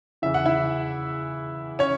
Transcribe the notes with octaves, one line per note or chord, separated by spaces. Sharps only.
E2 C#3 E3 E5
F#5
E4 E5
C#4 C#5